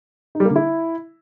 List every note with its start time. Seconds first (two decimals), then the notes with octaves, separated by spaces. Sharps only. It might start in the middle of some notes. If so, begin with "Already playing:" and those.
0.35 D#4
0.40 G3
0.45 A#3
0.50 D3
0.56 E4